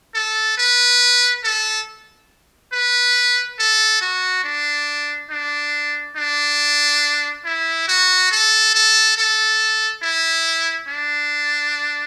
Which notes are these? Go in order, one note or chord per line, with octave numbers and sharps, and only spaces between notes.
A4
B4
A4
B4
A4
F#4
D4
D4
D4
E4
F#4
A4
A4
A4
E4
D4